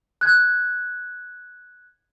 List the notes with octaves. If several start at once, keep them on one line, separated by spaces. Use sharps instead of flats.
F#6 G#6